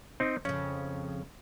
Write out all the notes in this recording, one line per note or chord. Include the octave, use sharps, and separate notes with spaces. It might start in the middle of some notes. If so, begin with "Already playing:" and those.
C4 D#4
F2 C#3 C#4